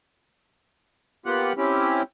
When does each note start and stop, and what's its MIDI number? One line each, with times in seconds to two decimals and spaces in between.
1.26 1.53 58
1.26 1.53 59
1.26 1.53 65
1.26 1.53 67
1.26 1.53 78
1.26 1.53 90
1.57 2.02 60
1.57 2.02 61
1.57 2.02 64
1.57 2.02 67